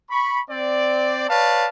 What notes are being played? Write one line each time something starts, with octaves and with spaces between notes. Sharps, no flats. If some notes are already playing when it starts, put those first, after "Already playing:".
B5 C#6
C4 D5
B4 C#5 D5 F5 A5